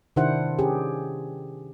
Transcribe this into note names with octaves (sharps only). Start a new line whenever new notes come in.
C3 D#3 D4 E4 C5 F#5
C#4 G4 G#4